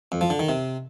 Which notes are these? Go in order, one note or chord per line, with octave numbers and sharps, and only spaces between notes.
F2
F3
D3
D#3
C3